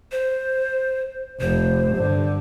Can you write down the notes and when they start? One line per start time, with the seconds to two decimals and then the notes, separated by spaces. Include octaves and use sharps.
0.12 C5
1.41 F1 C5
1.96 G2 D3